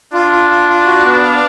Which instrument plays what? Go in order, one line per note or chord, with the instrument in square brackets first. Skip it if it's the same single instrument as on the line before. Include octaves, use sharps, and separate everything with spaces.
[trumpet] D4 [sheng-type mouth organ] F4
[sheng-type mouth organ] F4
F4
F4
F#4
B3
F5